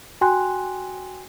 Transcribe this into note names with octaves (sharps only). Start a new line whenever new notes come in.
F#4 G5 G#5 C6 F#6